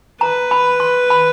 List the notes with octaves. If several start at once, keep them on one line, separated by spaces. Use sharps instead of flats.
B4 A#5
B5
C6
B5